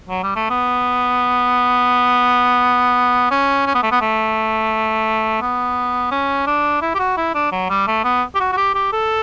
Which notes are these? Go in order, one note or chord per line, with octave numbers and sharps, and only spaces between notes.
F#3
G3
A3
B3
C#4
C#4
B3
A3
B3
A3
B3
C#4
D4
E4
G4
F#4
E4
D4
F#3
G3
A3
B3
G4
F#4
F#4
G4
G4
A4